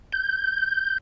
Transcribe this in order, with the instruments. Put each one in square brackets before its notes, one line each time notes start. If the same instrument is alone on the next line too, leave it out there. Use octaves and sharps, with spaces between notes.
[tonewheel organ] G6